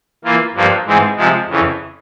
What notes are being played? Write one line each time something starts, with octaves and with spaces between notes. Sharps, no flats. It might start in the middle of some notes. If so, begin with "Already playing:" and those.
E3 A#3 F4
G2 F3 A#3
G#2 E3 G#3 C4
C3 F3 G#3
F2 C#3 E3